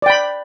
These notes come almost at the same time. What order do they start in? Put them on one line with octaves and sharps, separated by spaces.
D5 G5 B5